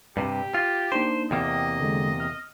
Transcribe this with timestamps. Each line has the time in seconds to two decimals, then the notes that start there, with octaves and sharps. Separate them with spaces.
0.17 G2 C3 G4
0.54 F4
0.92 A#3 D4 D#4 C5
1.31 E2 C3 A#3 D#5 G5
1.80 D3 G#3
2.20 F6